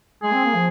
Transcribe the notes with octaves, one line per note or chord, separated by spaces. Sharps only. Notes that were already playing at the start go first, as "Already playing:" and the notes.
G#3 G#4
C4
A#3
F3